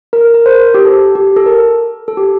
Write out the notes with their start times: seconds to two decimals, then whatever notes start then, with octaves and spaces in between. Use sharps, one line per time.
0.13 A#4
0.34 A#4
0.46 C5
0.55 A#4
0.74 G4
0.85 A4
1.15 G4
1.36 A4
1.46 A#4
2.08 A4
2.17 G4